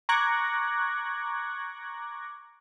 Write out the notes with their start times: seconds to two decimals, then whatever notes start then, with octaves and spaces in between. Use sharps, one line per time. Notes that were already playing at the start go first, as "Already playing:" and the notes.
0.09 A#5 C#6 D6 F#6 G#6 A#6